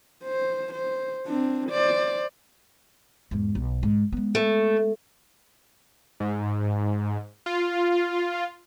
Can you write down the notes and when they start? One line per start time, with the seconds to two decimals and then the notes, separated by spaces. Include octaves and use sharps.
0.25 C5
0.74 C5
1.27 C4 D4
1.70 C5 D5
3.31 E2 G#2
3.55 B1
3.83 G#2
4.12 G#3 B3
4.35 A3
6.20 G#2
7.46 F4